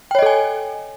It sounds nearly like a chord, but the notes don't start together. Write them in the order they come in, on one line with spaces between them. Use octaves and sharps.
G5 C#5 D#5 A4 G#5